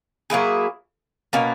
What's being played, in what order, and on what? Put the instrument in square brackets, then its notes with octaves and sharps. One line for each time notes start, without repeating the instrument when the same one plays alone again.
[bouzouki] F#3 A#3 E4 G#4
B2 A#3 C#4